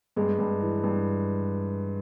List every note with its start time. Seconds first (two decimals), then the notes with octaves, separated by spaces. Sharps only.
0.16 G2 G#3
0.39 G2
0.60 E3
0.83 G2